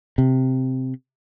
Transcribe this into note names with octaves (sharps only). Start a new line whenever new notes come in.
C3